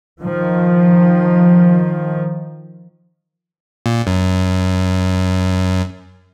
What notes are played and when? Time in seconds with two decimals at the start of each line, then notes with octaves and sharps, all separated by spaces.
0.20 D#3 F3
3.86 A#2
4.07 F#2